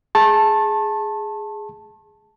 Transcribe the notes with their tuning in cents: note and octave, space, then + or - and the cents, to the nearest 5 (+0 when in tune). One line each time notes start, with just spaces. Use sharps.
G#4 +0 A5 +0 C#6 -45